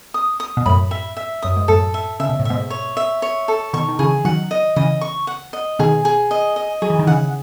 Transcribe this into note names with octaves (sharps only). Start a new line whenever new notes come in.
D#6
D#6
B2
F#2 A2 B5
E5
E5
F#2 D#6
G#2
F#2 A2 A4
E5
C#3 E5
B2
A2
G#2 B2 E5
C#5
E5
C#5
A4
B2 D#3 C#6
D#3
C#3 E3 G#4
D#3 F#3 F#5
D#5
C#3 E3 D#5
C#6
F#5
D#5
B2 D#3 G#4
G#4
D#5
D#5
F#3 G#4
E3
D#3
C#3 E3 F#5